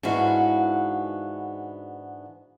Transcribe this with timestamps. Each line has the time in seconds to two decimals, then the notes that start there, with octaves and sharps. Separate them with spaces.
0.03 G#2 D3 E3 B3 F#4 F5